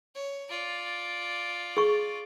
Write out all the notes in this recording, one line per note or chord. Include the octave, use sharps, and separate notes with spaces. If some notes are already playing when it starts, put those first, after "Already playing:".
C#5
F4 D5
G#4 C#6